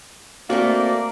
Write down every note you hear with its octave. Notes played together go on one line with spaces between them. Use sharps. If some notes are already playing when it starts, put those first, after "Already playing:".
A3 A#3 C4 F#4 D5